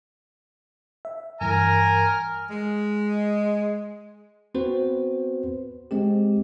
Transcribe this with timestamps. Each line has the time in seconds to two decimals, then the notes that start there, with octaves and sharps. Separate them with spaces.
1.05 E5
1.41 G2 E3 G#5 A#5 F6
2.50 G#3
4.55 B3 C4 F#4 B4 C5
5.91 G#3 C4 G4